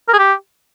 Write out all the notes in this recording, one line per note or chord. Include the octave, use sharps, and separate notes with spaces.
A#4
G#4
G4